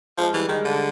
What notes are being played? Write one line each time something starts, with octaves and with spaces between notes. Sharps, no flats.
F3 G#3
E3 G3
D#3 G#3
D3